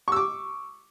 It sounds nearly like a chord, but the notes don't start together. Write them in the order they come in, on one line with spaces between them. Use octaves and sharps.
C#6 E6 D6